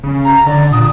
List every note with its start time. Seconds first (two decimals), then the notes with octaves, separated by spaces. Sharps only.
0.03 C#3
0.24 A#5
0.46 D3 D5
0.72 A#2 D#6